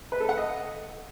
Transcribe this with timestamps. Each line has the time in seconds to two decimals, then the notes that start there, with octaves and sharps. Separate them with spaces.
0.12 B4
0.20 A4
0.29 F#5
0.37 D#5